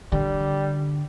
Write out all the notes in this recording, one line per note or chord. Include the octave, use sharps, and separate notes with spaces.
D3 G3